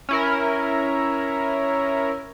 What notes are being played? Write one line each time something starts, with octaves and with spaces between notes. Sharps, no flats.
C#4 E4 A#4